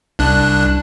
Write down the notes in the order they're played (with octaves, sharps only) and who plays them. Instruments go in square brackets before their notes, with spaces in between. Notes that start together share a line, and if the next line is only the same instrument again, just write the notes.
[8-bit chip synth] C2 D4 F#6